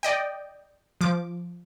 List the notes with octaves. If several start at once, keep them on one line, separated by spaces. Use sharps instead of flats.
D5 D#5 G5
F3 D6